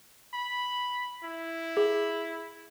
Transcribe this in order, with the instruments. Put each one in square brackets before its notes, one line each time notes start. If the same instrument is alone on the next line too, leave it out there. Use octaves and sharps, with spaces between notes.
[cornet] B5
E4
[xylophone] G#4